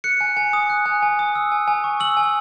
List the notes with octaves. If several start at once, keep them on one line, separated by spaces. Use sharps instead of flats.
F#6 C#7
G#5
G#5
D#6
F#6
G#5
G#5
D#6
E6
G#5
G#5
C#6
E6 F#7
G#5